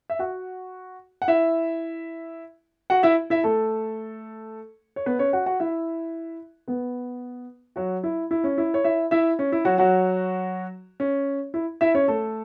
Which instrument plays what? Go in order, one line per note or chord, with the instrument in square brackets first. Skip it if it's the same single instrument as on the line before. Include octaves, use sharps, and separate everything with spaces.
[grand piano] E5
F#4 F#5
F#5
E4 E5
F#4 F#5
E4 E5
E4 E5
A3 A4
C#5
B3 B4
C#4 C#5
F#4 F#5
F#4 F#5
E4 E5
B3 B4
F#3 F#4
E4
E4
C#4
E4
C#5
E4 E5
E4 E5
C#4
E4
F#3 F#4
F#3 F#4
C#4
E4
E4 E5
C#4 C#5
A3 A4